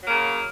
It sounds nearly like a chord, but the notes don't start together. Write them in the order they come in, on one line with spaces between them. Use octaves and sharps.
F#3 A#3 C#3